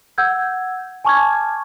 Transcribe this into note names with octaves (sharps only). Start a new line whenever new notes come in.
F#5 E6 G6 G#6
G#5 A5 C#6 D6 F6 G#6